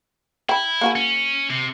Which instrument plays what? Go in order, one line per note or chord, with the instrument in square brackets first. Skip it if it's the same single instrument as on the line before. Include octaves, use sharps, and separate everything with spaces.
[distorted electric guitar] E4 [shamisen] G5 B5
[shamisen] A#3 F#4 G#4
[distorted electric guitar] C#4
C3